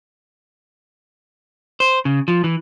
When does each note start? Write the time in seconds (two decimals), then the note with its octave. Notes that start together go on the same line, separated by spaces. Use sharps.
1.80 C5
2.05 C#3
2.28 F3
2.44 E3